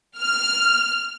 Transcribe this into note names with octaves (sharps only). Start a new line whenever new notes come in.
F6